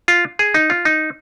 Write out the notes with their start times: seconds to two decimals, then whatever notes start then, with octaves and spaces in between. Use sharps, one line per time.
0.08 F4
0.39 G#4
0.54 D#4
0.70 F4
0.85 D#4